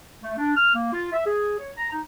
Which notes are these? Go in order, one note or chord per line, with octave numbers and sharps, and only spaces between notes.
A3
D4
F6
A#3
F4
E5
G#4
C#5
A#5
D#4